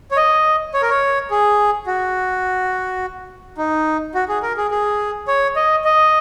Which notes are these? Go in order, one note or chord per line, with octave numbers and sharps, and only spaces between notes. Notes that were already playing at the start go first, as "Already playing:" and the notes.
C#5
D#5
C#5
A#4
C#5
G#4
F#4
D#4
F#4
G#4
A#4
G#4
G#4
C#5
D#5
D#5